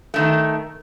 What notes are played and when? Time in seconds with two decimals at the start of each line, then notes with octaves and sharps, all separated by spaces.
0.14 D#3 A3